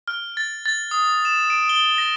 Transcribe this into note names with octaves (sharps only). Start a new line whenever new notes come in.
F6
A6
A6
D#6
E7
D7
G7
A#6